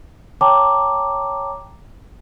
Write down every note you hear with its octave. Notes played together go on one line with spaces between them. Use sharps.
C#5 G5 A5 A#5 D6